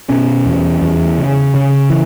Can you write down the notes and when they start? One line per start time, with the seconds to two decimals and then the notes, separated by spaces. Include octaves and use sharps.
0.09 B2 C#4
0.46 E2
0.82 E2
1.18 C#3
1.55 C#3
1.90 E3